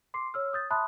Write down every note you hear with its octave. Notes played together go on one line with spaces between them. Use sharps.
C6 D6 C7
C#5 E6 F6
D#6 G6 A6
E5 A5 B5 C6 D#6 F#6